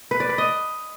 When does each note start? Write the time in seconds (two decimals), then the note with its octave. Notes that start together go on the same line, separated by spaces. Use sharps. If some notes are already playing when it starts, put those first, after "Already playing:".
0.11 B4
0.20 D5
0.29 B4
0.38 D#5